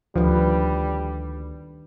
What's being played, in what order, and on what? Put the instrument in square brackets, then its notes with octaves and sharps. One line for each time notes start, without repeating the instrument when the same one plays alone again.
[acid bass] D2 [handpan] D#3 D4 B4 [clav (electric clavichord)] F3 [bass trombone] G3